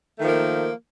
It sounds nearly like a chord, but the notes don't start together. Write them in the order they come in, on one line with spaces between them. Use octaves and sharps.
A3 D#3 F3 A#3